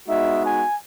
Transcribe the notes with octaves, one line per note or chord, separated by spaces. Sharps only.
G#3 B3 D#4 F#4 E5
G#5